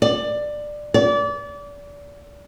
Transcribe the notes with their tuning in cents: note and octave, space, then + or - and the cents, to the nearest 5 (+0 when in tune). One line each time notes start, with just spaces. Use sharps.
D5 +15
D5 -30